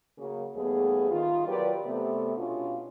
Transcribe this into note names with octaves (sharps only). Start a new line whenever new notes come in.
C#3 F#3 A#3
D#2 G3 A3 B3 G#4
D#3 F4
F#3 G4 A#4 B4 D5
C3 A3 B3
B2 C#4 D4 F4